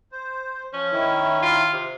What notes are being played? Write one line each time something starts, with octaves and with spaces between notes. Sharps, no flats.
C5
F3 C#4
D#3 E4
F4
C3